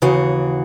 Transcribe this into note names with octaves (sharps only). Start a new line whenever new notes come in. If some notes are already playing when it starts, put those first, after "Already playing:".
D#2 C#3 E3 F#4